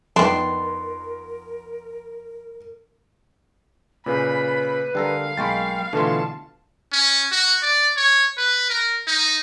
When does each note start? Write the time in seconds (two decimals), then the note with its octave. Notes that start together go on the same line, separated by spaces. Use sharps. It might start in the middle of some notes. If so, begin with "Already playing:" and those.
0.16 F2 D#3 B3 D4 A#4 C6
4.06 A#2 C#3 B4 B5
4.95 D3 G3 A4 A#4 F5
5.37 B1 G#3 A#3 G5 B5 C#6 A6
5.93 B2 D3 E3 A3 F4 A5
6.93 C#4
7.32 F#4
7.62 D5
7.97 C#5
8.37 B4
8.70 A#4
9.07 D#4